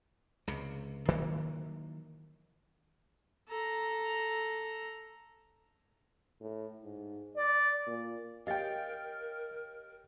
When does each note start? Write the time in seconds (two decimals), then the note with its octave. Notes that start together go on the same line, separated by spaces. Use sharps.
0.47 C#2 C3
1.08 D#3 E3 F#3 A#3
3.49 A4 A#5
6.40 A2
6.84 G#2
7.36 D5
7.87 A#2
8.47 G4 A#4 C#5 D#5 F5 G5 A6